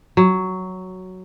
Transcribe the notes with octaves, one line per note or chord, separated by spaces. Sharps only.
F#3